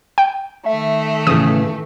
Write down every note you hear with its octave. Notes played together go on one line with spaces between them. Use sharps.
G5
D#3 A3 E5
A2 C#3 E3 D#6